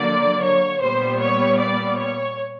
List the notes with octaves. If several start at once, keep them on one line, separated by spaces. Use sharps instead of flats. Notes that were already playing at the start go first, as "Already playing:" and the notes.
Already playing: D3 F#3 A#3 D5
C#5
A#2 G3 B3 C5
C#5
D5
C#5